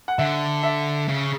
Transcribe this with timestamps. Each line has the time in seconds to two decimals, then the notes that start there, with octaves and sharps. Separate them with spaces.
0.08 F#5
0.18 D3 E5
0.63 E5
1.08 C#3